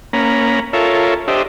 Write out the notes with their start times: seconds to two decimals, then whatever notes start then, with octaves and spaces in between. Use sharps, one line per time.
0.13 A#3 C#4 A#5 B5
0.73 F4 A4 A#4 C#5 E5
1.28 D4 G4 C5 D#5 E5